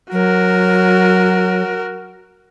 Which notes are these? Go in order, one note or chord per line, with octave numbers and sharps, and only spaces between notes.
F#3 F#4 A#4